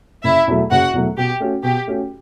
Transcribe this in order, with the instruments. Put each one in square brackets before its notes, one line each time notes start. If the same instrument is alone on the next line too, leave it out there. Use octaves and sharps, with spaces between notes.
[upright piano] F#1 [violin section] E4 E5
[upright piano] E2 B2 F#3 A3
[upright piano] F#1 [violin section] F#4 F#5
[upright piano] E2 B2 F#3 A3
[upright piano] B2 [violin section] G4
[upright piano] A3 C#4 F#4
[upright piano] B2 [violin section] G4
[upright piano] A3 C#4 F#4